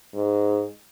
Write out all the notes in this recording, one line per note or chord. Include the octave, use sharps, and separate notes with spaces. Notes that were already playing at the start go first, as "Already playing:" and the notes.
G#2